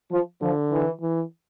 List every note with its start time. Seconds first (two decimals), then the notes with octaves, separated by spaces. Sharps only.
0.12 F3
0.42 D3 F3
0.71 E3
1.01 E3